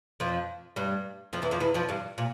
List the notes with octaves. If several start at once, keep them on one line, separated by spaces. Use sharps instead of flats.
F2 F3
G2 G3
F2 F3
E2 E3
F2 F3
E2 E3
F2 F3
G2 G3
A#2